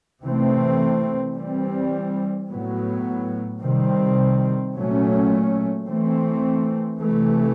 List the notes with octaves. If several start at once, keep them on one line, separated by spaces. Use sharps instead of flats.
C3 E3 A3 C4
E3 G3 C4
A2 F#3 B3
C3 D#3 G3 C4
A#2 F#3 A3 C#4
E3 A3 C4
C3 E3 A3